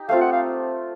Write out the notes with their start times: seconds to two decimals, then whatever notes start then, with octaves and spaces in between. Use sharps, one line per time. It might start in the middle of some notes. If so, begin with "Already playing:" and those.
Already playing: D#4 G4
0.09 A3 C4 F4 F5
0.21 F#5
0.32 F5